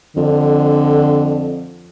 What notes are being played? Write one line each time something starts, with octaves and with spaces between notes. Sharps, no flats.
F2 D3